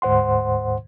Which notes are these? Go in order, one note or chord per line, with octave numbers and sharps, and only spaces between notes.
D2 G#2 C5 F#5 C6